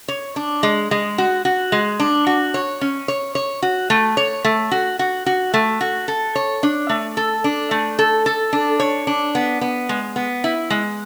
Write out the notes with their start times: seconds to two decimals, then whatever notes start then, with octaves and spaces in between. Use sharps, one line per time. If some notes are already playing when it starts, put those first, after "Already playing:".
0.08 C#5
0.36 D4
0.63 G#3
0.91 G#3
1.18 F#4
1.45 F#4
1.72 G#3
2.00 D4
2.27 F#4
2.54 C#5
2.81 C#4
3.08 C#5
3.35 C#5
3.62 F#4
3.90 A3
4.17 C#5
4.45 A3
4.71 F#4
4.99 F#4
5.26 F#4
5.54 A3
5.81 F#4
6.08 A4
6.35 C#5
6.63 D4
6.89 A3
7.17 A4
7.44 D4
7.71 A3
7.99 A4
8.26 A4
8.53 D4
8.80 C#5
9.07 D4
9.35 B3
9.61 B3
9.89 G#3
10.16 B3
10.44 E4
10.70 G#3